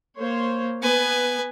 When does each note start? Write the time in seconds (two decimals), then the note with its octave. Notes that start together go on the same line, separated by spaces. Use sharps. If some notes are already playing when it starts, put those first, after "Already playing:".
0.19 A#3 C5 C#5
0.83 B3 B4 G#5